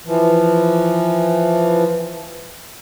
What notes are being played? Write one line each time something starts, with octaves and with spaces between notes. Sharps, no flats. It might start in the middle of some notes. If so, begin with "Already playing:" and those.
E3 F3